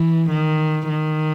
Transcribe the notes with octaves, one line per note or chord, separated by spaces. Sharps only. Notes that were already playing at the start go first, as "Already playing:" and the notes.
Already playing: E3
D#3
D#3